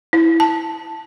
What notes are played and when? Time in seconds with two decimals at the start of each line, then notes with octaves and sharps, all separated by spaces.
0.13 E4
0.40 A5